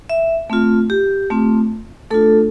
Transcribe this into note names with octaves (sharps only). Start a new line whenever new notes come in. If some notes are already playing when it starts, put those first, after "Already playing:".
E5
A3 C4 F4
G4
A3 C4 F4
A3 D4 F4 A4